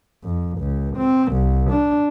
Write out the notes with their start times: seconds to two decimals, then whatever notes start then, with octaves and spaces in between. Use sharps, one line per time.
0.24 F2
0.59 C#2
0.97 C4
1.33 C2
1.71 D4